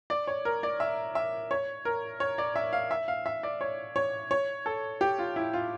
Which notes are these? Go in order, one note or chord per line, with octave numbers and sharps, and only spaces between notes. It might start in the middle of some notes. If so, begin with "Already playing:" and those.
D5
C#5
A#4
D5
E5
E5
C#5
A#4
C#5
D5
E5
F5
E5
F5
E5
D5
C#5
C#5
C#5
A4
G4
F4
E4
F4